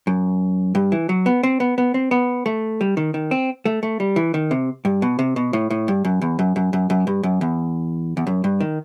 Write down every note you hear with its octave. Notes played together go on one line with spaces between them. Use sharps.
F#2
G2
E3
F#3
B3
C4
B3
B3
C4
B3
A3
G3
D#3
D#3
C4
A3
A3
G3
E3
D#3
C3
G2
B2
C3
B2
A2
A2
G2
F#2
E2
F#2
F#2
F#2
F#2
G2
F#2
E2
E2
F#2
G2
D#3